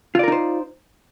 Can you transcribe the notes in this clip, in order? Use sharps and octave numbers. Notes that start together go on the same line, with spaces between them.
D#4 F4 A#4 C5 D5